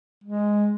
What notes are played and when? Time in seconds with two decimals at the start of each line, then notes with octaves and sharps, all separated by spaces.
0.24 G#3